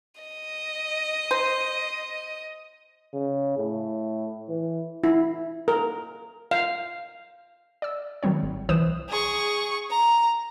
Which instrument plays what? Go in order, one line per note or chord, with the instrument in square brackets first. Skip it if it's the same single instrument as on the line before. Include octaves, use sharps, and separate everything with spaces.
[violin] D#5
[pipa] C5
[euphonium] C#3
A2
E3
[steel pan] E4
A#4
F5
[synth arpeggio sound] D5 E6
D#3 F#3 G3 C4 C#5
G#1
C2 E3 B4 C5 D#6 E7
[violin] G#4 C#6
A#5